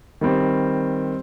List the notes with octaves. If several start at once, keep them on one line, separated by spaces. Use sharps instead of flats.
D#3 G3 C4